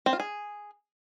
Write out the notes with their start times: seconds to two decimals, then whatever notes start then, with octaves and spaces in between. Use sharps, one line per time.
0.06 C4
0.13 F4
0.20 G#4